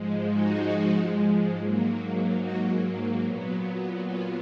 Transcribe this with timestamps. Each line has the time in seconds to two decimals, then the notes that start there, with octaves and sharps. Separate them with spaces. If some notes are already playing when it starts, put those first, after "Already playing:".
Already playing: G#2 F3 G#3
0.32 D#4 F#4
1.58 G#2 F#3 A#3
2.41 D#4 F#4
3.25 A#2 F#3 B3
4.08 F4